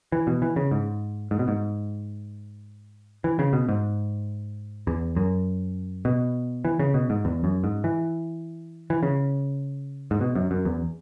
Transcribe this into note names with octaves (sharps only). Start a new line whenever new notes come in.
E3
B2
E3
C#3
G#2
G#2
B2
G#2
E3
C#3
B2
G#2
E2
F#2
B2
E3
C#3
B2
G#2
E2
F#2
G#2
E3
E3
C#3
G#2
B2
F#2
F#2
E2